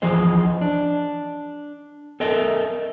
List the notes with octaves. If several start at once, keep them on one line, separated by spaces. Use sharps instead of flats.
E3 F3 G#4 C5 D#5
D4
A4 A#4 D#5 E5